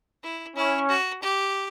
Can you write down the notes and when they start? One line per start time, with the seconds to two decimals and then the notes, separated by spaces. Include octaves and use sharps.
0.23 E4
0.56 C#4 E4
0.89 F#4
1.22 G4